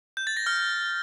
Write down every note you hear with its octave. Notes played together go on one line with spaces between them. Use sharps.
G6
A6
A#6
F6